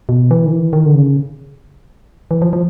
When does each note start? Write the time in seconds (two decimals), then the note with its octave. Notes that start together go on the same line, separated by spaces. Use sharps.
0.09 B2
0.31 E3
0.46 D#3
0.52 E3
0.73 D#3
0.86 D3
0.94 C#3
2.31 E3
2.42 F3
2.53 F3